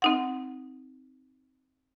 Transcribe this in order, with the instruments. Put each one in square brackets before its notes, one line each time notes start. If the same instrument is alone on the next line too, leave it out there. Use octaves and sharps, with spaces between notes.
[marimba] C4 D#4 F#5